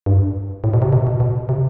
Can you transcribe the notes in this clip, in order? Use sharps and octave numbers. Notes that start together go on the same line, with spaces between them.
G2
A2
B2
C3
B2
B2
B2
C3